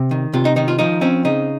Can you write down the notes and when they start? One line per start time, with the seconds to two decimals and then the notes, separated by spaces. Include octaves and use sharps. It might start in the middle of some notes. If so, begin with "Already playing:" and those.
Already playing: C3
0.11 D#3
0.33 C3 F4
0.45 D#4
0.56 D#3 D#4
0.68 F4
0.79 F3 D#4
1.01 C4 C#4
1.25 C#3 D#4